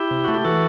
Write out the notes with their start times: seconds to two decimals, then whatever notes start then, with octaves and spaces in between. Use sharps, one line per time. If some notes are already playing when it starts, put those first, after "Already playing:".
Already playing: E4 G4
0.11 C3
0.24 A3 F#4
0.34 G4
0.45 E3 F#4 A4